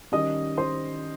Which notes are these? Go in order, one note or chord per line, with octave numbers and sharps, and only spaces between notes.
D#3 G3 C#4 D#5 D#6
C5 C6